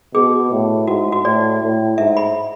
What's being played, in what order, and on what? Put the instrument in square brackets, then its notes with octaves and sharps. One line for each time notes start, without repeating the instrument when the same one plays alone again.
[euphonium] B2 [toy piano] G#4
[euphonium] A2
[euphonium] G#2 [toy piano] F#4
[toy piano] F#4
[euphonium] A2 [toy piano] D5
[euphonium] A2
[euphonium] G#2 [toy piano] E5
[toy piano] B5